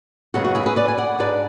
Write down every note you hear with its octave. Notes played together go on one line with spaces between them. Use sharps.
F#2 C#3 G#3 B3 F#4
F#4
E4 G#4
G#4 B4
B4 D5
G#5
D5 F#5
G#2 G#3 D4 B4 D5